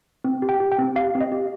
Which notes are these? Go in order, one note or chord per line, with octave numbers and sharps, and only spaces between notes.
C4
G4
G5
G4
G5
C4
G4 F5
C4
D#5
G4